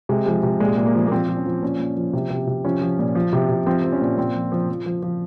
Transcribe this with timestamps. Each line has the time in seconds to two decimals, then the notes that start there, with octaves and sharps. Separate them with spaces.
0.09 C3 G#3
0.26 F3 G#3
0.43 C3
0.60 A#2 G#3
0.77 A#2
0.86 A#3
0.94 F3
1.07 A#3
1.12 F3 C4
1.29 F3
1.37 C#4
1.46 F3
1.63 A#2 C#4
1.79 A#2
1.97 F3
2.13 C3
2.30 C3
2.47 C3
2.65 F3 C#4
2.81 F3
2.99 A#2
3.15 F3
3.33 C3
3.49 C3
3.66 F3 C4
3.84 F3
3.92 C#4
4.01 A#2
4.18 A#2 C4
4.35 F3
4.52 F3
4.69 F3
4.86 F3
5.02 F3